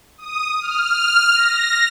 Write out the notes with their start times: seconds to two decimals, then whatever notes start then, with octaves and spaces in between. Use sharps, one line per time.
0.18 D#6
0.61 F6
1.35 A#6